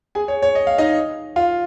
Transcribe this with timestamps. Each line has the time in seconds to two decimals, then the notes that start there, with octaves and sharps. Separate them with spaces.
0.15 G#4 G#5
0.28 C#5
0.42 C#5
0.55 D#5
0.67 F5
0.78 D#4 D#5
1.36 F4 F5